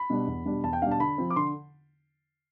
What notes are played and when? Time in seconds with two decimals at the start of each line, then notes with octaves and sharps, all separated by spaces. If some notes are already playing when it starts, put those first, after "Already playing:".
Already playing: B5
0.10 B2 G3 D4
0.27 E2
0.45 B2 G3 D4
0.64 E2 A5
0.73 G5
0.82 B2 G3 D4 F5
0.91 A5
1.00 D3 B5
1.18 F3 C4
1.30 D6
1.36 D3 C6